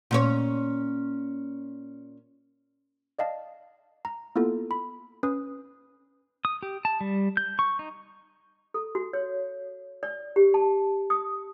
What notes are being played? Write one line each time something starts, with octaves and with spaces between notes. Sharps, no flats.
A#2 C#4 C#5
D5 D#5 F5 A5
A#5
A#3 B3 E4 F4 A4
B5
C#4 B4 D#6
D#6
G4
A5
G3
G6
C#6
D#4
A4
F#4
C#5
D5
G4
A5
D#6